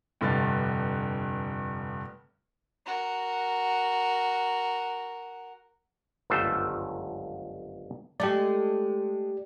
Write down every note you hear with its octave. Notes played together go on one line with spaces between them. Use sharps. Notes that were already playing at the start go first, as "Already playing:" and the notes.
F1 G2 D3 C6 A6
F#4 A#4
G1 C#2 F#2 F3 A3 C5
G#3 A3 G4 D5